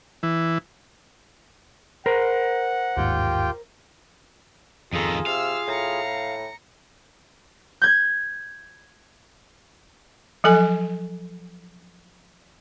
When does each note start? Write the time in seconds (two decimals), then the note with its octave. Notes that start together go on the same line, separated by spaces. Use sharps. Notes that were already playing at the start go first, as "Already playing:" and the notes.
0.23 E3
2.06 A#4 C5 F#5
2.97 G1 D#2 G#2 F4 G4 G5
4.93 F2 D#3 F4 G#4 A4 A#5
5.26 C3 F5 E6 F6
5.67 A2 A#5 C#7
7.82 G6 G#6
10.44 F3 F#3 A4 G#5